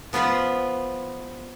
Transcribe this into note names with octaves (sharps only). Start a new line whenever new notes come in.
F3 B3 F4 B4